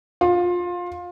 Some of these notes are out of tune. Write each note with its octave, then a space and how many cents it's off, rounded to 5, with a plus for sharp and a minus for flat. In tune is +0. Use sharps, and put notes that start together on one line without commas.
F4 +20